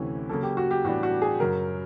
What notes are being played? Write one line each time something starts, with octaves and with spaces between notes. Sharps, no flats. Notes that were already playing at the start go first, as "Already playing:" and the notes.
Already playing: D2 C3 E3 A3 C#4
C#3 F#3 A#3 A4
G4
F#4
G4
A2 E3 G3 B3 D4 F#4
F#4
G#4
F#2 C#3 F#3 A#4